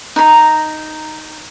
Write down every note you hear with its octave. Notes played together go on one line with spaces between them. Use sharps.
D#4 A#5